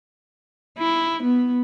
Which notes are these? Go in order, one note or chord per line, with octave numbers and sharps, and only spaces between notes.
E4
B3